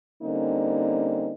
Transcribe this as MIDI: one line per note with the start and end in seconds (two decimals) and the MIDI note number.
0.22 1.33 50
0.22 1.33 55
0.22 1.33 58
0.22 1.33 60
0.22 1.33 61
0.22 1.33 63